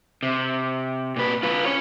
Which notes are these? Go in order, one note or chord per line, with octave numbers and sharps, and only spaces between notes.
C3
A#2 B4
F4 B4
C#4 C#5